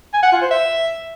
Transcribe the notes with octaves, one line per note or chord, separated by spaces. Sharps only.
G#5
F#5
F4
C5
E5